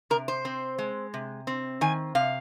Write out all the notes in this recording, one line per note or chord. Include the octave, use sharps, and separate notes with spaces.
C3 A#4
C5
C4
G#3
C3
C4
D#3 G#5
C3 F5